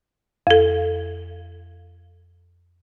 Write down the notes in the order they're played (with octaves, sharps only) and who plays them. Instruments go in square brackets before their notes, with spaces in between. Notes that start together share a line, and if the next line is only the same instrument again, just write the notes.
[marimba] F2 A4